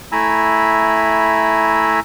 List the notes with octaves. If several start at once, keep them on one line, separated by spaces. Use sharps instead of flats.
A3 E4 G#5 A#5 B5 E6